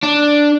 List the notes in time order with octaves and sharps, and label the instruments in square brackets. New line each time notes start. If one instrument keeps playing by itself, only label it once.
[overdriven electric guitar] D4